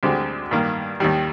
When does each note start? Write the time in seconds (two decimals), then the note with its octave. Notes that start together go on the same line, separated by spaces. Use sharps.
0.03 D2 D3 G#3 C4 G4
0.51 G2 D#3 A#3
1.00 D#2 D#3 G3